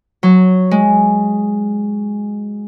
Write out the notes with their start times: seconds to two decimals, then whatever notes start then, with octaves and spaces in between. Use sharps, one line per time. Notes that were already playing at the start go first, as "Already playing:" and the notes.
0.23 F#3
0.71 G#3